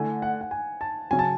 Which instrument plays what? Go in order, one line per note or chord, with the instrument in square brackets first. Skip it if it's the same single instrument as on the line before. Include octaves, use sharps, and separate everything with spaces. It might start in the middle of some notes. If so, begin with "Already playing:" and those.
Already playing: [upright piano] D3 A3 E4 [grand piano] G#5
[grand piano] F#5
F#5
G#5
A5
[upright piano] C#3 F#3 C#4 [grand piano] G#5
[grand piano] A5